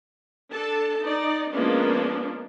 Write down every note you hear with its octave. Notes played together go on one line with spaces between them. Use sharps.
D4 A4 A5
D#4 D5
F3 G#3 A#3 B3 C#4 D4